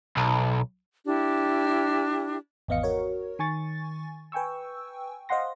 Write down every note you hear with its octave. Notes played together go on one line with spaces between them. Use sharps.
B1
D4 E4 G4
G#1 E2 B3 D#5 F5 C#7
F#4 A#4 C#5
D#3 G#5 C#6 A6
B4 G5 G#5 C#6 E6
C5 D#5 F5 F#5 C6 A#6